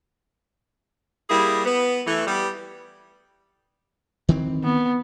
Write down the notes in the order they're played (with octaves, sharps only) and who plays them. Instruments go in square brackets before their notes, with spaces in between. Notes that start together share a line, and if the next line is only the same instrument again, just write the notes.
[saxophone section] G3 A#3 E4 G#4
B3
E3 A3
G3 B3
[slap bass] D#3 E3 C4
[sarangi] B3